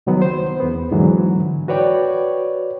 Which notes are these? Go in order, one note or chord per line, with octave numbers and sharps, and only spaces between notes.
C2 D#3 F#3 B3
C5
E2 B3
G#2 D3 E3 F#3
F#4 B4 C#5 D5 G5